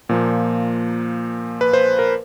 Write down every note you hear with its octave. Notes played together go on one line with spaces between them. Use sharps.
A#2 F3 A#3
B4
C5
A#4